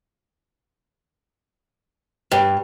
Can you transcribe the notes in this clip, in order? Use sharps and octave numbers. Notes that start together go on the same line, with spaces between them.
G2